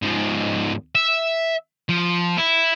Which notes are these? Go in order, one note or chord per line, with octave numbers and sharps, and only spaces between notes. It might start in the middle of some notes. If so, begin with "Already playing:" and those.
G#2 F3
E5
F3
E4